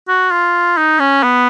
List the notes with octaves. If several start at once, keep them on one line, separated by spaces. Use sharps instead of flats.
F#4
F4
D#4
C#4
B3